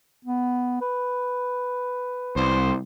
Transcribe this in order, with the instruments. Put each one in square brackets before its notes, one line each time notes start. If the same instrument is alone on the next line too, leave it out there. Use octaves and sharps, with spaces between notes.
[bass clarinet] B3
B4
[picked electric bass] C2 [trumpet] C5